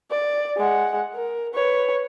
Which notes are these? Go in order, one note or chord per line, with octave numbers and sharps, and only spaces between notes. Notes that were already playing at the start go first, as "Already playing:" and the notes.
D5
G#3 F#5
A#4
B4 C#5